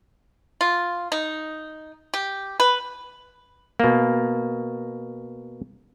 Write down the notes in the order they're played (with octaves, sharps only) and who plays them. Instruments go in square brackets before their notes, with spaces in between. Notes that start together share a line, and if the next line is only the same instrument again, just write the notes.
[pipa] F4
D#4
G4
B4
[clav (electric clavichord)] B2 A#3